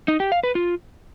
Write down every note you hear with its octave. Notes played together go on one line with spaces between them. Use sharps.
D#4
G4
F5
B4
F4